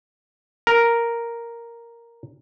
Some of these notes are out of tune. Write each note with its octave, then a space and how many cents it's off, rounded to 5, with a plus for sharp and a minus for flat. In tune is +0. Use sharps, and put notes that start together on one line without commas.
A#4 +0